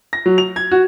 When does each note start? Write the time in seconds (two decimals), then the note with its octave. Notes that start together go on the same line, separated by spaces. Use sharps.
0.13 A#6
0.26 F#3
0.38 F7
0.56 G#6
0.71 F#4